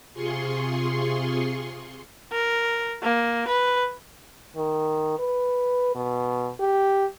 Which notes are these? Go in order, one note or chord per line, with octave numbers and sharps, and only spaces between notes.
C3 F4 G#4 C6 C#6
A#4
A#3
B4
D#3
B4
B2
G4